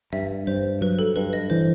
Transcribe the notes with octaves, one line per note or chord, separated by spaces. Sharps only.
G2 E5
G2 C5
F#3 B4
A4
G2 B4
D#5
E3 C5